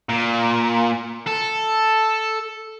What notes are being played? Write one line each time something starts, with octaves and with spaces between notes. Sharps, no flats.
A#2
A4